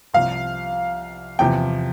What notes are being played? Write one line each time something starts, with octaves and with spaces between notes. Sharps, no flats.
C2 C3 F3 F5
E2 C3 F3 G5